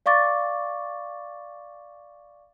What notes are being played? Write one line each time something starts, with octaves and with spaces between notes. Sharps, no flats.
D5 F5 C#6 D6 A6